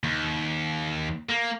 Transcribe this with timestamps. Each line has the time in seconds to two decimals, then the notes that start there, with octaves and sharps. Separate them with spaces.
0.04 D#2
1.30 A#3